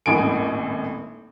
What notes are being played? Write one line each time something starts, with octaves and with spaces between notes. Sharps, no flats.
D#1 G#1 A2 A4 G#5 D7